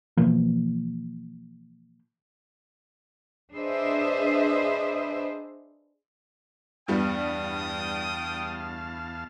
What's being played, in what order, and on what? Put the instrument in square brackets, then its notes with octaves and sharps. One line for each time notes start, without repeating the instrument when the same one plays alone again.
[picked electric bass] B2 E3 F3 A#3
[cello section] D4 G#4 B4 C5 D#5 E5
[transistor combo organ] E2 F5 A5 [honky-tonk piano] G2 G3 B3 [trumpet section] G5 D#6